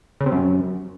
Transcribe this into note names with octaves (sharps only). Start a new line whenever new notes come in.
C#3
C3
F#2